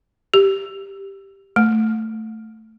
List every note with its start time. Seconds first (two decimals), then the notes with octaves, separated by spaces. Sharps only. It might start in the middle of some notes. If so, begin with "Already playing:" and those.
0.34 G4
1.56 A3